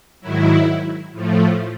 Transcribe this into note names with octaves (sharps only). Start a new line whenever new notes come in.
G#2 D#3 F#3 E4
A2 F3 A3